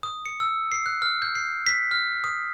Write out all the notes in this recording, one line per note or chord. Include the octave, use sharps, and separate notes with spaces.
D#6
C#7
E6
C7
F#6
F6
G6
C7
B6
F6
D#6